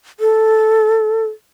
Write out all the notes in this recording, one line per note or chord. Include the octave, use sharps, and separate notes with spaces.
A4